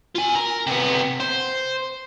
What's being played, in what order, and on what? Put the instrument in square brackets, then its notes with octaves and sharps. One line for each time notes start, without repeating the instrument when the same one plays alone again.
[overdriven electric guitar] F4 G#5
A#4
C3 B3
C5